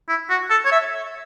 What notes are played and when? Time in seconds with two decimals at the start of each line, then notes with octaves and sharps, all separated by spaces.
0.09 E4
0.30 F#4
0.50 A4
0.65 C#5
0.72 E5